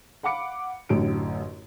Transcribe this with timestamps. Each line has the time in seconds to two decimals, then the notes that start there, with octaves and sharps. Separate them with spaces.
0.23 F5 F#5 B5 D6 C#7
0.89 A1 F#2 A2 D3 D7